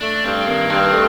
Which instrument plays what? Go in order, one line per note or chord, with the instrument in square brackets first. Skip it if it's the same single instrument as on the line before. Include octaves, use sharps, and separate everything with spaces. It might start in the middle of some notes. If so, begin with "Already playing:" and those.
[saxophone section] A3 [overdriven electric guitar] D4
[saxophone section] G2 [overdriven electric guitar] C4
[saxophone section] D#3 [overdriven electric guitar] A#3
[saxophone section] G2 [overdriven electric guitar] C4
[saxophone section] A3